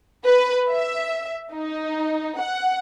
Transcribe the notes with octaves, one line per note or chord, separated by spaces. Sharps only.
B4
E5
D#4
F#5